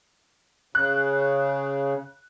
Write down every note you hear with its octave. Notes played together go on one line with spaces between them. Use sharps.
C#3 F#6